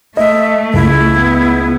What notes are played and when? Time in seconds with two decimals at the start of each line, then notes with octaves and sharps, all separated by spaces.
0.17 A3 D#5 E5
0.74 C#2 E4
1.17 B3